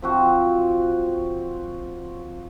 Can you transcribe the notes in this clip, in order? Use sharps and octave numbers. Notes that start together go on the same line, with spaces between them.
F3 C4 F#4